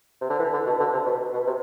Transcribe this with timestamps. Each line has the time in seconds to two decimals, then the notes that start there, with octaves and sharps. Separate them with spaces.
0.21 C3
0.30 D3
0.39 E3
0.53 D3
0.66 B2
0.80 D3
0.93 C3
1.06 B2
1.33 B2
1.46 C3